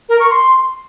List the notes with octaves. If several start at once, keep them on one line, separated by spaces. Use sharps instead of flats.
A#4
C#6
C6